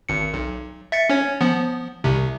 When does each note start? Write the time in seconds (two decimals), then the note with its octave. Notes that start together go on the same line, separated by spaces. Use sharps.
0.09 G#1 C#7
0.34 B1
0.92 E5 A6 C#7
1.10 C#4 C#5
1.41 F3 B3
2.04 C2 C3